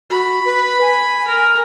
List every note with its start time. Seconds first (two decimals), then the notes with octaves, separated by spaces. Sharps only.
0.10 F#4 B5
0.45 B4
0.81 G#5
1.28 A#4